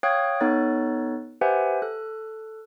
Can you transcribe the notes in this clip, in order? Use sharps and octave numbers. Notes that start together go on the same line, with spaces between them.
C#5 F5 G5 D#6 F#6 G#6
B3 D#4 A4 C#5 F#6 A6
G4 B4 C5 E5 F#5 G#5
A4 F#6